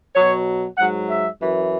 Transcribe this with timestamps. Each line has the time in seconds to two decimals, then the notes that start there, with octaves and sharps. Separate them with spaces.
0.15 B2 F#3 C#5
0.78 G#2 F#3 F#5
1.09 E5
1.40 F#2 E3